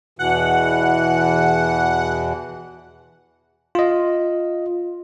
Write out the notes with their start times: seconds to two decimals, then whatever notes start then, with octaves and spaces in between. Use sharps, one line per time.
0.19 E2 B2 E3 F#5
3.75 F4 D#5